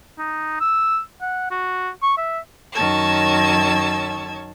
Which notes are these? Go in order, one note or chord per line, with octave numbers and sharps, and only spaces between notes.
D#4
E6
F#5
F#4
C#6
E5
F#2 D#3 C#5 A5 E6 G#6